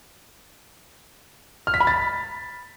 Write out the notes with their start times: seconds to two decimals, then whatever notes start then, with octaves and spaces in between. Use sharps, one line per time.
1.67 F6
1.74 B6
1.80 B5
1.87 A6